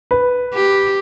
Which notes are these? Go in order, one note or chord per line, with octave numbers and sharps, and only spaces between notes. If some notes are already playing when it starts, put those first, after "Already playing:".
B4
G4